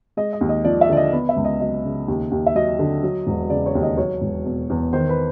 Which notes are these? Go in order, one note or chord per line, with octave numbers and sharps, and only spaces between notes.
G#3 D#5
D#5
D#2
D#5
F3 D5
E5
D3 D5
D#5
B3
E5
C#2
D#5
F#3 D#5
C#3
D#2
D#2
E5
F#3 D#5
D3
F#3
E1
C#3 D5
C#5
D#2
D#5
F#3 C#5
E1
B2
E2
D#3 C5
B4